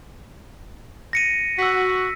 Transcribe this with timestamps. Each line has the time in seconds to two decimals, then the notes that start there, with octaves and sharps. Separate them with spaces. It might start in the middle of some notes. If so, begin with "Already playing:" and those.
1.13 A#6 C#7 D#7
1.59 F#4 E6 B6